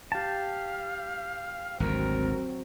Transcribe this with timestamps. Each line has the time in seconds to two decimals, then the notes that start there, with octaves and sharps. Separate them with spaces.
0.12 G4 F5 A5
1.80 G#1 D2 F#3 C4 A#4